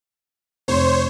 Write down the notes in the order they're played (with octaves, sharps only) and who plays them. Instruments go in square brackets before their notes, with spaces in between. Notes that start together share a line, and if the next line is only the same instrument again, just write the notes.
[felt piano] F1 C6 [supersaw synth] C5 C#5